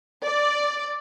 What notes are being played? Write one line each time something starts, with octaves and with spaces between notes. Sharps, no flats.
D5